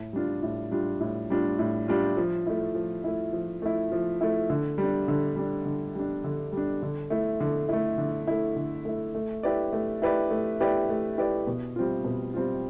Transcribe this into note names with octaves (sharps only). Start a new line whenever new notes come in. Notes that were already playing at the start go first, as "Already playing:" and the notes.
Already playing: A2
G3 D4 F4
A2
G3 D4 F4
A2
G3 D4 F4
A2
G3 D4 F4
F3
A3 E4
F3
A3 E4
F3
A3 E4
F3
A3 E4
D3
G3
D4
D3
G3 D4
D3
G3 D4
D3
G3 D4
D3
A3 E4
D3
A3 E4
D3
A3 E4
D3
A3 E4
A3
E4 G4 B4 D5
A3
E4 G4 B4 D5
A3
E4 G4 B4 D5
A3
E4 G4 B4 D5
B2
G3 C4 F4
B2
G3 C4 F4